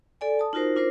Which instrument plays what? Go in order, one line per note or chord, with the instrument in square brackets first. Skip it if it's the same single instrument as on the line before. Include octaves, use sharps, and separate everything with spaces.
[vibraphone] A4 D5 G#5
A5 D#6
D#4 F4 F#4 A#4 C5
D4 F4 A#4 C5